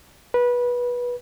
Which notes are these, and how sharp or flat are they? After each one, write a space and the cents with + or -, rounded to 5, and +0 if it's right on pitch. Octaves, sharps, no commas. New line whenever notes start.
B4 -20